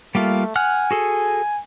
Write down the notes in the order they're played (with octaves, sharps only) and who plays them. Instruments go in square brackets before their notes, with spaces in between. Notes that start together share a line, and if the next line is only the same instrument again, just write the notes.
[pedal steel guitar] G3 A#3 F4 [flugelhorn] A3
[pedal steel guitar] F#5 F6 F#6 [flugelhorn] G#5
[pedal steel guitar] F#4 G#4 A4